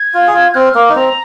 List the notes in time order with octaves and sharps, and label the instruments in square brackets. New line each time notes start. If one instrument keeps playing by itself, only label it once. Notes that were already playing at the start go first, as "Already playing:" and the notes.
Already playing: [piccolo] G#6
[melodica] F4
G#4
F4
[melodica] C4 [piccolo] F6
[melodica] A#3
D#4
[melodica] C4 [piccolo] A#5